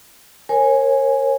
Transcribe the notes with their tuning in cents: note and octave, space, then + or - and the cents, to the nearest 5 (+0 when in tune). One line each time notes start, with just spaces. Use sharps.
A#4 +0 C#5 -35 G#5 +0